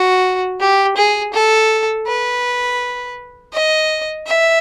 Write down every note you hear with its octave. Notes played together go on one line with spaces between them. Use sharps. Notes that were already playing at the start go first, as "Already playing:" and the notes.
Already playing: F#4
G4
G#4
A4
B4
D#5
E5